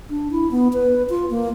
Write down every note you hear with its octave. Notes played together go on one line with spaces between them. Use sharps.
D4
E4
B3
B4
F4
A#3